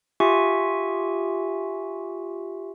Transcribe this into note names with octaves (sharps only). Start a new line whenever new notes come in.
F4 G4 E5 G#5 C#6